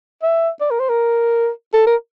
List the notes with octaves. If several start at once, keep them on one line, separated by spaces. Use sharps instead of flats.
E5
D5
A#4
C5
A#4
A4
A#4